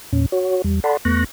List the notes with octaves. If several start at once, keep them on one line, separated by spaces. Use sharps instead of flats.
E2 A#2 C#4
F#4 C#5
E2 G3
A4 D5 F#5 A5 B5 C6
E2 A3 B3 C#6 F#6 A#6